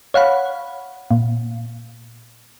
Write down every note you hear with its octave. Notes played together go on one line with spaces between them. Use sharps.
C#5 F5 F#5 B5
A#2